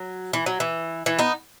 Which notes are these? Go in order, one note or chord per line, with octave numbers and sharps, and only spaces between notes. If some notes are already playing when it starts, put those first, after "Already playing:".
Already playing: F#3
E3
F#3
E3
E3
B3 D#4